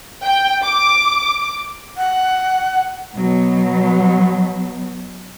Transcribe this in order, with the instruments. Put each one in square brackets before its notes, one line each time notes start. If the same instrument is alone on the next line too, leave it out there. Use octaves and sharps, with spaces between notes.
[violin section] G5
D6
[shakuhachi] F#5
[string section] B2 F#3